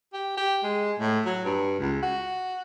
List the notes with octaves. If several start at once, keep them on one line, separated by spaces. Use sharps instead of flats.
G4
G4
G#3
A2
F#3
G2
C#2
F#4